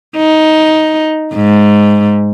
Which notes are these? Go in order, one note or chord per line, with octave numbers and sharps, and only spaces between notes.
D#4
G#2